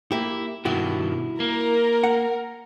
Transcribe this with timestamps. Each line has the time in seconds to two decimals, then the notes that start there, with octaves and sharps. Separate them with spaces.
0.12 A#3 E4 G4
0.65 G2 B2 D#3 E4 F#4 G4
1.40 A#3 A#4
2.04 F#5